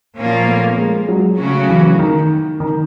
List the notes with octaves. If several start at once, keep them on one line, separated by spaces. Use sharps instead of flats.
A#2 F3 A#3 C#4 F4
A3 B3
G#3 A#3
F#3 G#3
C#3 F#3 A3 C#4 F#4
E3
D#3
D#3